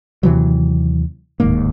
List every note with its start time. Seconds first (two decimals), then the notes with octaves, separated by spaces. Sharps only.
0.23 D#2 C3 E3 F#3
1.40 D1 D#2 G#2 A#3